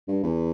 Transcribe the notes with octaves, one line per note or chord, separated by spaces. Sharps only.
G2
E2